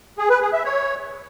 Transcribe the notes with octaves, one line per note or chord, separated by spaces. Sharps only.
G#4
B4
G#4
E5
C#5